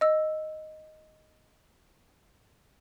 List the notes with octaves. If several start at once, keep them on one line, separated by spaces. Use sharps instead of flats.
D#5 E6